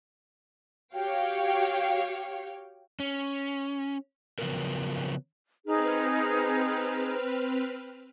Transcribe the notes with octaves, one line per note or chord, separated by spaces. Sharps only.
F#4 G4 C#5 F5 G5
C#4
C#3 F3 F#3 B3 A#4
C4 D#4 G#4 B4 F6